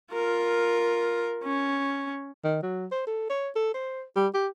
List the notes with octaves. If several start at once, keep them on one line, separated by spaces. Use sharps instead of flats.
F4 A#4
C#4
D#3
F#3
C5
A4
C#5
A4
C5
G3
G4